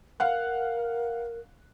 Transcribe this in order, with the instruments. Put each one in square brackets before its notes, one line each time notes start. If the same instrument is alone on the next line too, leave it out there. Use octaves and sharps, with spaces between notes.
[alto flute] A#4 [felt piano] F5 F#5 F#6